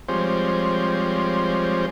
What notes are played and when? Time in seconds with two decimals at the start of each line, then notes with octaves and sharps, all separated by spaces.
0.08 F3 G3 G#3 C4 C5 C#5